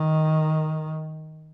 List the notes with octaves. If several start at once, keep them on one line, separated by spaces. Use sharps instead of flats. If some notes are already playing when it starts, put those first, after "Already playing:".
Already playing: D#3